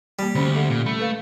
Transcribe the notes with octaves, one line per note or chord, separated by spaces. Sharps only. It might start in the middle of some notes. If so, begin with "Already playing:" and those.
E3 G3 A#3
D2 C#4 C5 B5
A4 E5 F#5
A#2
A3 B5
A4 B4 F5